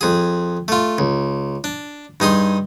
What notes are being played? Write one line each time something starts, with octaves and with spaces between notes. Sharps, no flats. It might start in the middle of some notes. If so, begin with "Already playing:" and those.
F2 G#4
A3 F4
C#2
D4
G2 D#4 G#4 C6